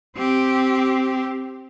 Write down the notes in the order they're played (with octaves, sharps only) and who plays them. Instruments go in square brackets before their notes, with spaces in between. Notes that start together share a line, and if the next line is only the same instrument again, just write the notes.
[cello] C4 G4